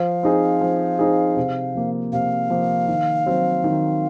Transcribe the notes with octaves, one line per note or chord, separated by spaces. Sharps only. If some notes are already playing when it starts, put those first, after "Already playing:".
Already playing: F3 F5
C4 D#4 G#4
F3
C4 D#4 G#4
C3
F3 A#3
C3 F5
F3 A#3
D#3
F#3 C4
D#3